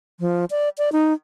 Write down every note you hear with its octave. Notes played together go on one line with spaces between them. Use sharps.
F3
D5
D5
D#4